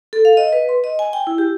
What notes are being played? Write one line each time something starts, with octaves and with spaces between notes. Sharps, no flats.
A4
F5
D#5
B4
C6
D#5
G#5
G5
E4
G4